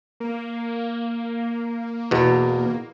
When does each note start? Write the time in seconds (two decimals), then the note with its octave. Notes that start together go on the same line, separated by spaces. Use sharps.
0.20 A#3
2.11 E2 B2